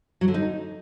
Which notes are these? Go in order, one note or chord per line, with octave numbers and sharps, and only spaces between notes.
F#3
D3
D#4